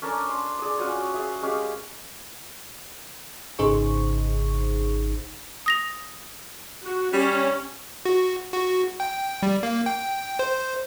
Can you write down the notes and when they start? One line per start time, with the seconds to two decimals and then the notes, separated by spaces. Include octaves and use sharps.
0.02 C#4 D4 A4 A#4
0.29 C6
0.59 G#4 D5
0.78 C#4 F4 F#4 C#5
1.14 G#4 E5
1.42 G#3 C#4 G4 F5
3.59 G#1 C#3 D#4 G#4 C5 C#6
5.66 D#6 A#6 F7
6.82 F#4
7.13 G3 C#4
8.05 F#4
8.53 F#4
9.00 G5
9.43 G3
9.63 A#3
9.86 G5
10.39 C5